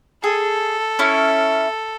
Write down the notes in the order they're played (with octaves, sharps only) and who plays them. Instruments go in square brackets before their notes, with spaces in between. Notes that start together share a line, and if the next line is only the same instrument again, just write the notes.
[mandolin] G#4 [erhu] A4
[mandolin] C#4 E4